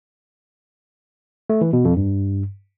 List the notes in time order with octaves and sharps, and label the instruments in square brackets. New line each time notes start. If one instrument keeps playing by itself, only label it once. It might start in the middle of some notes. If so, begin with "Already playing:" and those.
[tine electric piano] A3
E3
B2
F2
G2